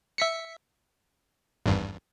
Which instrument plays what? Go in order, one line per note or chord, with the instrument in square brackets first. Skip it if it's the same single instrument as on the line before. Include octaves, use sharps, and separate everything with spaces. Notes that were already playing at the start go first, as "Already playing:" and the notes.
[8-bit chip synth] E5 B6 C#7
G#1 E2 G2